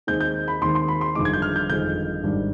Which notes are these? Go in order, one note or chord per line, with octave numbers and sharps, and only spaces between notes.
D#2 D#3 G#3 C4 G6
G6
B5
D#2 D#3 G#3 C4 C6
C6
B5
C6
G1 F2 D#3 G#3 D6
G#6
G6
F6
G6
G1 F2 D#3 G#3 G6
G#1 G#2 G3 D4